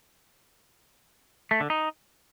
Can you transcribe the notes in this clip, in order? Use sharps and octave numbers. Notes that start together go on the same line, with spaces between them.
A3
D3
D#4